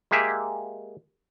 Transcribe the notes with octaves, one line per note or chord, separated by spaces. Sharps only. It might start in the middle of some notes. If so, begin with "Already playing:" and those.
G#3 A#3 G4 G#4 E5